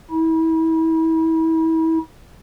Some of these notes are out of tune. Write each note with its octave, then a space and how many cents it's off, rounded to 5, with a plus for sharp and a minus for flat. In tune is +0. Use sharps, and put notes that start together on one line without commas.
E4 -30